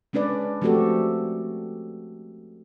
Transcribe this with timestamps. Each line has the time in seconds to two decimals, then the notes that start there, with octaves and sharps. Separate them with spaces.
0.13 G#3 C#4 D4 B4 D5
0.62 F3 A3 C4 F#4 G4 A4